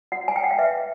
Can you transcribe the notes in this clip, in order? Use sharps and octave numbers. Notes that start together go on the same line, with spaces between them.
F#4 F#5
G#5
G5
F#5
F5
B4 E5